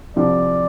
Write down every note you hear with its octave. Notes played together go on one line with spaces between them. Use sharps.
C2 C3 F3 D5